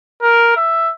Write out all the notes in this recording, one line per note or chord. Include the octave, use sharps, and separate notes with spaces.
A#4
E5